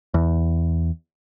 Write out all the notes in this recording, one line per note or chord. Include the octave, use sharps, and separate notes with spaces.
E2